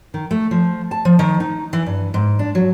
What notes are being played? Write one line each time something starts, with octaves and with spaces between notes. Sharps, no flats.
D#3
A3
F3
A5
F3
D#3
D#4
E3
G2
G#2
D4
F#3